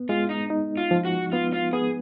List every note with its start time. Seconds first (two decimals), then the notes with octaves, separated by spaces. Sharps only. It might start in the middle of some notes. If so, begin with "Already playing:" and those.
Already playing: B3
0.09 G#3 F4
0.29 D#4
0.50 D#4
0.77 F4
0.91 F3
1.05 F#4
1.32 B3 F4
1.53 F4
1.73 B3 G#4